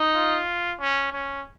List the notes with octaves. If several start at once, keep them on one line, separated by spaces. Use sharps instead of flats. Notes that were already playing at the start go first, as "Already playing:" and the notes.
Already playing: D#4
F4
C#4
C#4